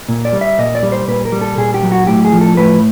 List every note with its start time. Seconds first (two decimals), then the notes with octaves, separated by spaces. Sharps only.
0.09 A#2
0.25 D5
0.33 G3
0.41 E5
0.59 A#2 D#5
0.75 D5
0.83 G3
0.92 C5
1.08 A#2 B4
1.25 A#4
1.32 G3
1.41 A4
1.57 A#2 G#4
1.74 G4
1.83 F#3
1.92 F#4
2.07 A2 G4
2.25 G#4
2.33 F3
2.41 A4
2.57 A2 B4